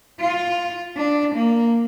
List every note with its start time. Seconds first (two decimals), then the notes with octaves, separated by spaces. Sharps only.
0.21 F4
0.97 D4
1.35 A#3